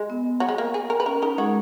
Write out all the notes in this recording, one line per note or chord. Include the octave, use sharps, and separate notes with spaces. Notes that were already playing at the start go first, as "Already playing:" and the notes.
Already playing: G#3
B3
F#3
G#3
A#3
G#4
A#4
B4
C#4 A#4
D#4 A#4
G#3 F#4 G#4